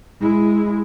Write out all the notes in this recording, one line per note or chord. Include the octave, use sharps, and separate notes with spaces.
G#3 E4